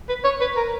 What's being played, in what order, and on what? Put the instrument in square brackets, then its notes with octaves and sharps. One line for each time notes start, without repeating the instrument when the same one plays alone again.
[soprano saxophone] B4
C#5
B4
A#4